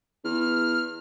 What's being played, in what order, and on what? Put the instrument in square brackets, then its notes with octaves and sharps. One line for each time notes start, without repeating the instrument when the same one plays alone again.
[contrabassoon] E2 [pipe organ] F6